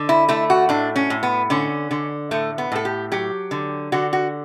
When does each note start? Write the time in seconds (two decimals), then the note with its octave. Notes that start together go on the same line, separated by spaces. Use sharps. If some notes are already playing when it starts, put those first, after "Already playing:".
Already playing: D3
0.09 E4
0.29 A3 E4
0.50 F#4
0.69 A2 D4
0.96 C#4
1.10 A2
1.23 B3
1.50 D3 C#4
1.91 D3
2.31 A2 A3
2.58 B3
2.72 A2 A4
2.85 G4
3.12 F#3 G4
3.51 D3
3.92 D3 F#4
4.13 F#4